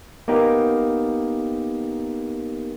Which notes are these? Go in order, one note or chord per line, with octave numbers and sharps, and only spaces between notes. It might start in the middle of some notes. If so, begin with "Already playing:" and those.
A#3 B3 D#4 G4 A#4